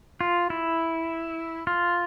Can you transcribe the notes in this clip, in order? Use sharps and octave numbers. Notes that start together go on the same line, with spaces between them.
F4
E4
F4